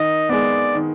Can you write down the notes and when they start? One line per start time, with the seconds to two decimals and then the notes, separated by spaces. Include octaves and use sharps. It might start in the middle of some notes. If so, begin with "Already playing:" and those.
Already playing: D#3 D#5
0.29 G#3 B3 D5
0.75 D#3